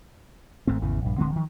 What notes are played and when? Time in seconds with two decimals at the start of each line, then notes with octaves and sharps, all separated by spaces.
0.67 G#1 G#2 A3 C4
0.81 G#1 E2 C#3 E3
1.05 A#1 G2
1.18 D1 D3 G#3 C4
1.32 D#3 F3